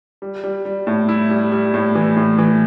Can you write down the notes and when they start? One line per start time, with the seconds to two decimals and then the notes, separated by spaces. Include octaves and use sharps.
0.22 G3
0.44 G3
0.65 G3
0.87 A2
1.09 E4
1.30 G3
1.52 G3
1.74 A2
1.95 E3
2.17 A2
2.39 E3